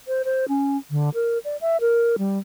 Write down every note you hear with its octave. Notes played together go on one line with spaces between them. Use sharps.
C5
C5
C#4
D3
A#4
D5
E5
A#4
G3